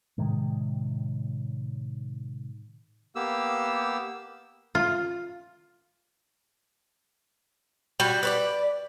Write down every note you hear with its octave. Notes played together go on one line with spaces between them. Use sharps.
A2 C3 D#3 G#3
A#3 B3 G4 E6
F4
G3 F#4
B4 C#5 D5